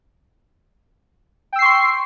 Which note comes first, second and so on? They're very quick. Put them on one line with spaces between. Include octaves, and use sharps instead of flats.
G5 E6 C7 C#6 C6